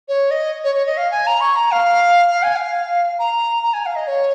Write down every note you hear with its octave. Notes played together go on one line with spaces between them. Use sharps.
C#5
D#5
C#5
C#5
D#5
F5
G#5
A#5
C#6
A#5
F5
F5
G#5
F5
A#5
A#5
G#5
F5
D#5
C#5